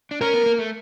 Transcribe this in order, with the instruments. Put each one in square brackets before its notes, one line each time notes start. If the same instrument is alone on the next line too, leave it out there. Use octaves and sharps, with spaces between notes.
[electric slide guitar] D4
[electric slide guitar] C#4 [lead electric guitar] A#4
[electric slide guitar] B3
A#3
A3